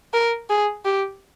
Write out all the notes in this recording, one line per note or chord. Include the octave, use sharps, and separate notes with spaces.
A#4
G#4
G4